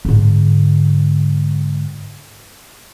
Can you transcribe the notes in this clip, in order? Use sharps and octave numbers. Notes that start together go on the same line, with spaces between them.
G#2 D3